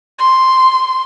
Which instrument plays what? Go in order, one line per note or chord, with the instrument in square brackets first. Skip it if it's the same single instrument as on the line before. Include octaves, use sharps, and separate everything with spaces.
[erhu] C6